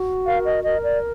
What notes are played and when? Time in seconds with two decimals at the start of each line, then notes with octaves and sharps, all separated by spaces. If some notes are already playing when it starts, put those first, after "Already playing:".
Already playing: F#4
0.26 A#4 F5
0.45 D#5
0.64 A#4 D#5
0.84 D5